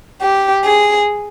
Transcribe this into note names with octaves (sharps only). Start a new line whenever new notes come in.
G4
G#4